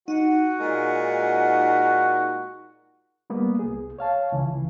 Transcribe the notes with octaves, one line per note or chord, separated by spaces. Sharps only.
D#4 F#4 F#5
A#2 G#3 A#4
G3 A#3 B3
C2 G#4
C#5 F5 A5
C#2 C#3 E3